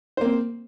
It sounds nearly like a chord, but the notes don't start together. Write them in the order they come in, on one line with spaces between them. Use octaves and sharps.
C5 A#3 C4